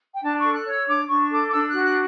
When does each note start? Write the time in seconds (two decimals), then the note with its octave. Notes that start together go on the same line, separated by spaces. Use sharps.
0.13 G5
0.22 D4 A5
0.38 C#6
0.43 A4
0.54 F#6
0.66 C#5 F#6
0.70 E6
0.87 D4 D6
1.08 D4 C#6
1.30 A4 D6
1.47 D6
1.51 D4 E6
1.68 F#6
1.74 F#4
1.83 F#6